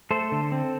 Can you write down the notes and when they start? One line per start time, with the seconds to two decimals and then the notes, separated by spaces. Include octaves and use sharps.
0.11 A3 A4 C5
0.32 D3
0.52 C4